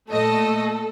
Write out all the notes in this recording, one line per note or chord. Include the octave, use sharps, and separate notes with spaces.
A#2 A3 A4 D#5